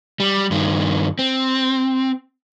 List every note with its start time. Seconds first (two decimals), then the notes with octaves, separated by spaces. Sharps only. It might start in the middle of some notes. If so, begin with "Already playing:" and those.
0.20 G3
0.51 G2 D#3
1.19 C4